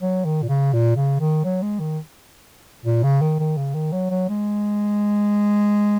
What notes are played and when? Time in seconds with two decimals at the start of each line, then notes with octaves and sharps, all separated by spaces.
0.02 F#3
0.25 D#3
0.42 A#2
0.49 C#3
0.73 A#2
0.96 C#3
1.19 D#3
1.44 F#3
1.62 G#3
1.79 D#3
2.86 A#2
3.03 C#3
3.21 D#3
3.39 D#3
3.57 C#3
3.74 D#3
3.92 F#3
4.11 F#3
4.29 G#3